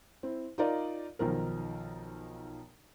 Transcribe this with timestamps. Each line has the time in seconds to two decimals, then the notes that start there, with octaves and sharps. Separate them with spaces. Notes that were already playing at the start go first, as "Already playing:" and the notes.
0.23 C4 E4
0.58 D#4 F4 A#4 D5 D#5
1.19 B1 D#3 F3 A#4